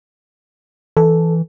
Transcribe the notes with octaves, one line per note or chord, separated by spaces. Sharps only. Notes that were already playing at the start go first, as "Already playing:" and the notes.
E3 A4